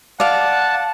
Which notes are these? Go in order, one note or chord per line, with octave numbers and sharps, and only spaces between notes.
D5 F5 F#5 A5